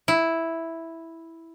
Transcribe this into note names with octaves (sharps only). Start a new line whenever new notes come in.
E4